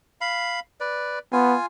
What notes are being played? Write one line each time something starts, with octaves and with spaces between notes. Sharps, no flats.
F5 B5
B4 D5
B3 F4 G#5